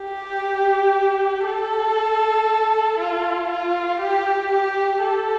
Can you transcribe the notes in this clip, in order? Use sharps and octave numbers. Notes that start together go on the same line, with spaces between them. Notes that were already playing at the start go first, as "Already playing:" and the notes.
Already playing: G4
A4
F4
F4
G4
G4
A4